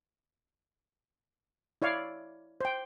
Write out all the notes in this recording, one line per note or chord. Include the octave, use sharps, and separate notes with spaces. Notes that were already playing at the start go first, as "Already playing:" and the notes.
E4 C#5 D5 F5
C5 G5